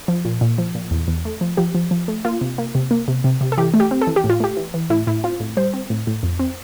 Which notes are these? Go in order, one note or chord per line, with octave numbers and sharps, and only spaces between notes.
F3
A#2
A#2
F3
A#2
E2
E2
A3
F3
F3 G4
F3
F3
A3
A#3 F4
C3
A#3
C3
A#3
C3
C3
C3
A4
E3 G4
A3
G4
C4
A4
E3
G4
A2
F4
A3 G4
E3
E3
A2 E4
A2 E4
C4 F4
A2
G3 C5
C4
A2
A2
F2
C4